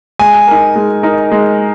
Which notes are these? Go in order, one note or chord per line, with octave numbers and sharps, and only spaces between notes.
G#3 G#5
D#4 A#4
G#3
D#4 A#4
G#3